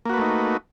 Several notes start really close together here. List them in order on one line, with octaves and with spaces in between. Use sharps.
A#3 F#4 B4 A3 D#4